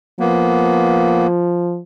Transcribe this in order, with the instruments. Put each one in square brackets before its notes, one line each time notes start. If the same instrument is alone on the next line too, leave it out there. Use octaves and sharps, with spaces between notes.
[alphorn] F3 [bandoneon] A#3 B3